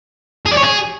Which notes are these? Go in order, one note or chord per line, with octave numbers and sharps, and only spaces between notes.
G#4
D5
C#5
G#4